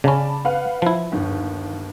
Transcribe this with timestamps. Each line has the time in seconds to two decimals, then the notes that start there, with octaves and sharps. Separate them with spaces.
0.04 C#3 C#4 D5 A5 B5
0.45 B4 F5 F#5
0.82 F3 E4
1.12 G1 D#2